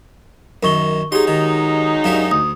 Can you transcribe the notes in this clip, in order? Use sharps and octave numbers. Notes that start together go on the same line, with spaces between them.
F#2 D#3 A#4 C#6 G7
F#3 G#3 D#4 G4 G#4 C6
D#3
F#2 D4 G4 F5
D2 D#6